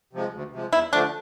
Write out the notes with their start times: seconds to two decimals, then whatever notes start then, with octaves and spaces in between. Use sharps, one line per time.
0.13 C3 F3 G#3
0.33 D2
0.53 C3 F3 G#3
0.73 E2 E4
0.93 D3 F3 A3 D4